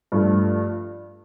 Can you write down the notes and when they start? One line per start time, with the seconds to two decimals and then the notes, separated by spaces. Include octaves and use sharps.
0.12 G2 F3 A3